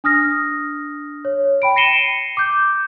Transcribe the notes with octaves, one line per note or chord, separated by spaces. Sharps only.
D4 D#6 F6 A#6
C#5
G5 B5 D7
A#6 C7 C#7 D#7 E7 G7
D6 G6